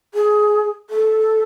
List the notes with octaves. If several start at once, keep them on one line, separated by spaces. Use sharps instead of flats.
G#4
A4